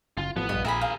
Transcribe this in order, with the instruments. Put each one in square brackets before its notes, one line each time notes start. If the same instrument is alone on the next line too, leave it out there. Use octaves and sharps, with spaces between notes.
[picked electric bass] F#1 [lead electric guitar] F4
[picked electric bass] A1 F3 [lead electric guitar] B3
[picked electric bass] A#1 G2 [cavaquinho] D#5
[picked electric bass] A#1 [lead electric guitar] G#4 A#4 [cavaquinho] E5 G#5 B5
[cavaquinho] F5